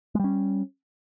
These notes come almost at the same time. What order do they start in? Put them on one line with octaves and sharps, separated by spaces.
G#3 G3 C#4